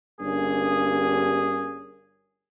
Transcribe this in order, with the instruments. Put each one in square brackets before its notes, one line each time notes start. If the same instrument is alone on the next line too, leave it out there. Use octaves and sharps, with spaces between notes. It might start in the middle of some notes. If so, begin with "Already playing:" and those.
[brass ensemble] G1 G2 A#3 C#4 G#4